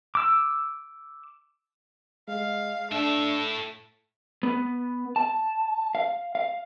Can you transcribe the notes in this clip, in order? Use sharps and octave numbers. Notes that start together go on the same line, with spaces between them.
D6 E6
G#3 F5
A2 A3 D4 E5
B3
A5
F5
F5